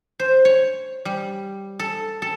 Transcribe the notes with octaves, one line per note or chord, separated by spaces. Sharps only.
C5
C#5
G3
A4
A4